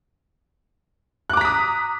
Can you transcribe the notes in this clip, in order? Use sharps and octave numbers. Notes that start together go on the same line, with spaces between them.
A#5 D6 D#6 F#6 B6